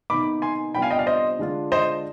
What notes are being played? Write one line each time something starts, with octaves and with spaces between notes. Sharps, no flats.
C3 D#3 B3 D#4 B5 D6
G#5 C6
C3 G3 B3 D4 F4 G5 B5
F5 G#5
D#5 G5
D5 F5
C5 D#5
D3 G#3 D4 F4
C5 D#5